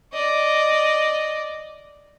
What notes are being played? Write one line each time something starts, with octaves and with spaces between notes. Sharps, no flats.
D5 D#5